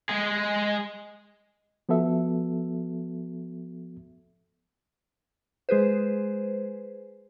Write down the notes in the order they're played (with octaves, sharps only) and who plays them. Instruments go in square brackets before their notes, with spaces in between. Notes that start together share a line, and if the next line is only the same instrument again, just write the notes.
[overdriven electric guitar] G#3 G#4
[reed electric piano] F3 B3 F#4 A4 E5
[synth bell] G#3 G#4 B4 C5